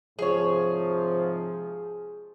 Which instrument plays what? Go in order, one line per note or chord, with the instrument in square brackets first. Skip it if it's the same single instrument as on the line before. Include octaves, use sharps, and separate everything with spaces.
[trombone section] G#2 C3 F3 [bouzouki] G#4 C#5